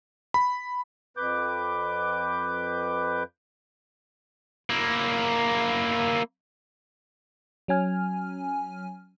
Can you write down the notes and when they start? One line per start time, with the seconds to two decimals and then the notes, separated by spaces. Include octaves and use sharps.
0.34 B5
1.17 F2 B4 D6 G6
4.70 A#3 E4
7.68 F#3 C#4 G#5 F6